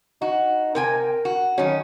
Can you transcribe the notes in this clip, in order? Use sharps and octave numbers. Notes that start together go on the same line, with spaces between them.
D#4 F#4
C3 A#4 G5 G#5
F#4
D#3 F#3 C#4